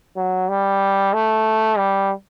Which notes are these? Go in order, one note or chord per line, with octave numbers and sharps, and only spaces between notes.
F#3
G3
A3
G3